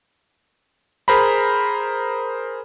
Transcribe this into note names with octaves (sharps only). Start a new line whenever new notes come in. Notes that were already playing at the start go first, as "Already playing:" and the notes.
G#4 A#4 C5 A#5 B5